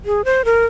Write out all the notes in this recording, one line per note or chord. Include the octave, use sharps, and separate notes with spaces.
G#4
C5
A#4